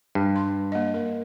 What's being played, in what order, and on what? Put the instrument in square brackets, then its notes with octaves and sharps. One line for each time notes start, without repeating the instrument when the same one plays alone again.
[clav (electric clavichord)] G2
[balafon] C6
A#3 D#5
A#4